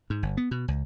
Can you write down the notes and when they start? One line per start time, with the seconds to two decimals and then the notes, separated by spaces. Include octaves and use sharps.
0.10 G#2
0.23 G1
0.37 B3
0.51 B2
0.68 C#2